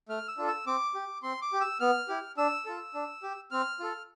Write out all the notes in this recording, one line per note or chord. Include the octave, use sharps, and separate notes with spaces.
A3 F6
E6
D4 F4 A4
E6
C4 D6
G4
C4 C6
D6
G4
E6
B3 F6
E4 G4
D4 E6
F4 A4
D4
G4
C4 F6
F4 A4